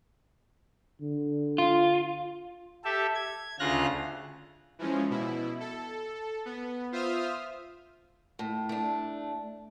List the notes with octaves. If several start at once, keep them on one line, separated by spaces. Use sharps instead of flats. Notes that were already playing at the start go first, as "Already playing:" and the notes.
D3
F4
G4 A4 E5
G#6
D2 C#3 F4 F6 F#6 A#6
E3 F3 G#3 C#4
B2 E4
A4
B3
F4 C5 E5 D#6 F6
A2
A3 D4